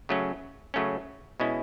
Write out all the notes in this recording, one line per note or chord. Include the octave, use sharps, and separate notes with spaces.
C#3 F#3 A3 C#4
C#3 F#3 A3 C#4
B2 G#3 C#4 E4